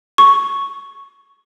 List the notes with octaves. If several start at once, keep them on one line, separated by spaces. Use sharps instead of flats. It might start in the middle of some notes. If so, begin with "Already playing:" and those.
C#6